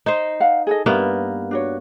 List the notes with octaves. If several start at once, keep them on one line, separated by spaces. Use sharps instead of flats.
D#4 C5
F5 F#5
G#4 A4 D#5
G2 A#3 B3 E5
D4 F#4 C#5